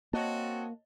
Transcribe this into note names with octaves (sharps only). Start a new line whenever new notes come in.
A#3 C4 F#4 C#5 D#5 A5